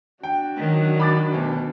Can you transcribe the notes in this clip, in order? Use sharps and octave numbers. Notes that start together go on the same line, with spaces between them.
D4 F#4 G5
D#3 F#3
B5 D6 A6
D2 B2